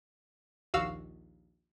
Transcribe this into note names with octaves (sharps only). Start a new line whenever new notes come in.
A#1 D#2 F#4 F5 E6